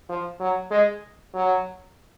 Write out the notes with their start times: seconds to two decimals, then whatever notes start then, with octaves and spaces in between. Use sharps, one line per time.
0.09 F3
0.40 F#3
0.71 G#3
1.34 F#3